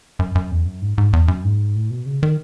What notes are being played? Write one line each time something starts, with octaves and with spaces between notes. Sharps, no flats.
F#2
F#2
E2
F#2
G#2
G#2
E2
F#2
G#2
A2
B2
C#3
D#3